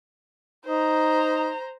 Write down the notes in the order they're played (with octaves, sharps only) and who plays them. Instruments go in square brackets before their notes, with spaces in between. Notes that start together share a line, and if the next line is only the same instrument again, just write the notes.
[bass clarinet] D#4 [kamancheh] C5 A#5